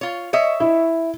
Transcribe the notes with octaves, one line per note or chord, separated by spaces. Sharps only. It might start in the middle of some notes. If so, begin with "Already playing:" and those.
F4 C#5
C#5 D#5 E5
E4